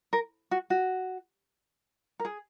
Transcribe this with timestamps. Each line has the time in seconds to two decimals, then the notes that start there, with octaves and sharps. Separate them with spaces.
0.13 A#4
0.51 F#4
0.70 F#4
2.20 A#4
2.25 G#4